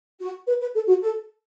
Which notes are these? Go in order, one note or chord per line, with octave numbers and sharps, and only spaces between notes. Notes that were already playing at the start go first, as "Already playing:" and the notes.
F#4
B4
B4
A4
F#4
A4